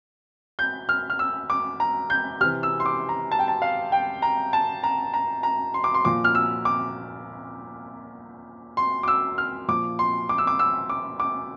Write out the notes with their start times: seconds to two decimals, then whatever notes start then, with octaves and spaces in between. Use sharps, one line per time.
0.59 G6
0.89 F6
1.10 F6
1.19 E6
1.50 D6
1.80 A#5
2.10 G6
2.40 C3 F6
2.44 E3
2.63 E6
2.80 C6
2.86 D6
3.09 A#5
3.31 A5
3.39 G5
3.48 A5
3.62 F5
3.92 G5
4.22 A#5
4.53 A5
4.83 A#5
5.14 A#5
5.43 A#5
5.74 C6
5.84 D6
5.94 C6
6.05 A#2 F3 D6
6.24 F6
6.35 E6
6.65 D6
8.77 C6
9.03 D6
9.08 E6
9.38 F6
9.68 A#2 F3 D6
9.99 C6
10.29 D6
10.38 E6
10.47 D6
10.59 E6
10.90 D6
11.20 D6